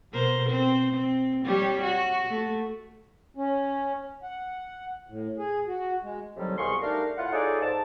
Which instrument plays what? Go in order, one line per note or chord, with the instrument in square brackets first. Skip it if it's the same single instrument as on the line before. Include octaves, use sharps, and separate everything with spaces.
[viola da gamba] B2 A#4 C5
C4 C5
C4
G3 G4 C#5
F#4
A3
[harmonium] C#4
F#5
A2
G#4
F#4
G#3
[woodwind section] A2 C3 D#3 F#3 G3
C2 B2 G#4 F5 C6 C#6
G3 A3 D4 D#4 A#4 F5
A2 E4 F4 F#5
D#4 F4 G#4 A4 C#5 D5
G#2 A5